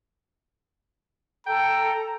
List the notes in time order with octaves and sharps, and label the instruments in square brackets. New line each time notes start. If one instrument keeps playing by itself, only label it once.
[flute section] A4 [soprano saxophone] G5 [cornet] A#5